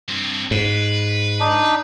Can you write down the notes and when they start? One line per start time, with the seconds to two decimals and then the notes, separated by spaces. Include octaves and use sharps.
0.09 G2 C4
0.51 G#2 B4
1.40 D4 D#4